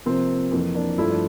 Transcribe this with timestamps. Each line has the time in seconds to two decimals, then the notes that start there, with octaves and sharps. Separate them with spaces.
0.06 C3 F3 A#3 C4
0.52 F2 E3 A#3
0.75 A#3 D4
0.98 G2 F3 A3 E4
1.10 D4